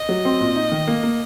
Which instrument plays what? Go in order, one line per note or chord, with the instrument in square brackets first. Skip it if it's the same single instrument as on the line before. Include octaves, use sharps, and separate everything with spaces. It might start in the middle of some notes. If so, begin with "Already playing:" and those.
Already playing: [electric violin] D#5
[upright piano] F#3
C4
A#2
D#4
D#3
A#3
A#3